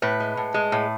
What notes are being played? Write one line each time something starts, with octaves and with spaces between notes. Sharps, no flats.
A2 B4
G#3
A2
G#3
A2